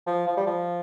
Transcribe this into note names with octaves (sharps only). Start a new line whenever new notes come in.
F3
F3
G3
F3